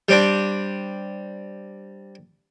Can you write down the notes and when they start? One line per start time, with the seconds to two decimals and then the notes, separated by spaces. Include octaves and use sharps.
0.09 G3 C4 D4